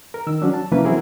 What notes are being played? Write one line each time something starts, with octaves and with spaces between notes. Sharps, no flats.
A#4
D#3 E6
F#3 C#4 D4
A5
C3 E3 F3 A#3 C#4 B4
F#3 C4 E4 F#4 G#4 A#4